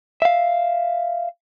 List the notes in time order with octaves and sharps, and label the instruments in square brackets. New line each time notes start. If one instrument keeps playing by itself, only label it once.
[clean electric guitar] E5 F5